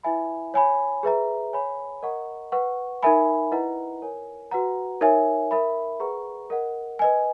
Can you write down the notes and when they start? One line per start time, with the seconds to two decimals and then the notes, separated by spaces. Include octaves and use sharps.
0.03 E4 B4 E5 G#5 B5
0.54 C#5 G#5 B5
1.03 G#4 B4 E5 A#5
1.53 C#5 G#5 B5
2.03 A#4 D#5 F#5 A#5 C#6
2.52 B4 F#5 C#6
3.03 D#4 A#4 E5 G#5 B5
3.52 E4 B4 D#5 F#5 A#5
4.02 A#4 C#5 G#5
4.51 F#4 B4 F#5 A#5
5.01 D#4 A#4 C#5 E5 G#5
5.51 A#4 E5 B5
6.00 G#4 B4 F#5 A#5 C#6
6.50 A#4 D#5 F#5
6.99 B4 D#5 G#5